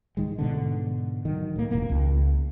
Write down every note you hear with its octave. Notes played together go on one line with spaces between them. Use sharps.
G#2 D#3 G#3
G#2 B2 D3
D#3 F#3
A2 A#3
E1 A#3
C#2